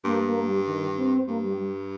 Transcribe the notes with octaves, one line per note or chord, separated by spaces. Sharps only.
G2 A#3
A#3
G3
D#3
C4
G2 A#3
G3
G3